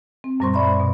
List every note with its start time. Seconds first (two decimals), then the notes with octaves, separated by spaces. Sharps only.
0.24 C4
0.40 F#2 A#2 G3 C5 C6 C#6
0.54 D5 E5 B5 C6
0.80 B2